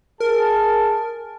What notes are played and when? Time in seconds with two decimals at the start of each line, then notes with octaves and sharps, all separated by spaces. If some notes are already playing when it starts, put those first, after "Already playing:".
0.20 G#4 A#4 A5